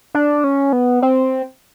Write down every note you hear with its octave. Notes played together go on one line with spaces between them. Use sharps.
D4
C#4
B3
C4